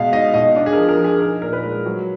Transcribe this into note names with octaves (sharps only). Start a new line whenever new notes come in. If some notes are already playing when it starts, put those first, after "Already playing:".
Already playing: B2 G#3 F5
D#4 D#5
B2 D#5
D4
G#4
F3 A#4
A#4
F3
G#4
D#4 A#4
A#2 A#4
B4
G#3
F#3